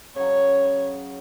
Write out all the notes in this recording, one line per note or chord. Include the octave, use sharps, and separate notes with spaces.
C#3 F#3 C#5